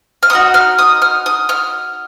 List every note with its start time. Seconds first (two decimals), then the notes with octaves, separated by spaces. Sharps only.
0.23 F6
0.30 B3 D#4 F#4 D#6
0.54 F6
0.79 D#6
1.02 F6
1.26 D#6
1.49 F6